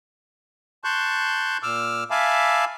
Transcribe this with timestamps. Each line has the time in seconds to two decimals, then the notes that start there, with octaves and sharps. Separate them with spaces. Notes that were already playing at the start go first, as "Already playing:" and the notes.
0.84 A5 C6 C#6 F#6 G6
1.63 A#2 D6 E6 F6
2.11 E5 F5 G#5 A5 B5 D6